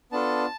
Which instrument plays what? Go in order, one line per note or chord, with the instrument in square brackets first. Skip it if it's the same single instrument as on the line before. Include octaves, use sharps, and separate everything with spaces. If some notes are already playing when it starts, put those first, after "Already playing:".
[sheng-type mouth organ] B3 D4 F4 A4 A5